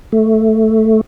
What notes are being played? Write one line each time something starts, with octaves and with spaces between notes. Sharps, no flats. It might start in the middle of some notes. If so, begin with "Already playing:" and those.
A3